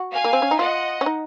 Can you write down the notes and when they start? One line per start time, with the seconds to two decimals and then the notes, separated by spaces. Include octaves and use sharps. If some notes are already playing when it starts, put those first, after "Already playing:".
Already playing: F#4
0.12 F5 G#5
0.24 A#3
0.33 C4
0.42 C#4
0.51 D#4
0.59 F4 D#5 F#5
1.01 C#4
1.06 D#4